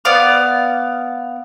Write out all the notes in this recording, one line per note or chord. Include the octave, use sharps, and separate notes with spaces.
B3 D5 F5 F6